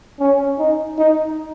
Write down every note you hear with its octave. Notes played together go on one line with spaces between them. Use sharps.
C#4
D#4
D#4